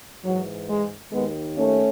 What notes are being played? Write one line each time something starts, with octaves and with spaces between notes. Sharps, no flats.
G#2 E3 F#3
G#3
D#2 D#3 G#3 B3
A3 C#4